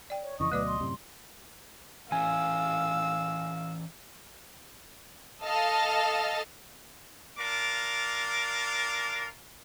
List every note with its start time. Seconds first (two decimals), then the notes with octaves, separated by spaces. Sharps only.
0.10 D5 G5
0.23 C#5
0.40 F2 C#3 E3 D#5 C#6
0.52 D2 B2 F#3 A3 B4 D5 D6
0.67 C6
0.80 F#2 A2 C3
2.12 E3 C#4 F5 G#5 E6
5.44 A4 D#5 F5 A5
7.39 D4 F4 A#4 D6